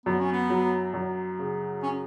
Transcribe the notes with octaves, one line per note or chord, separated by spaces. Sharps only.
F#2 B3
C#4
B3
F#3
F#2
C#3
C#4